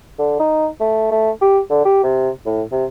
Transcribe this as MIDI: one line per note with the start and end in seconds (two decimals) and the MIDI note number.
0.19 0.38 50
0.39 0.68 63
0.80 1.09 57
1.11 1.30 57
1.41 1.59 67
1.70 1.83 50
1.85 2.03 67
2.03 2.29 48
2.45 2.62 45
2.72 2.85 48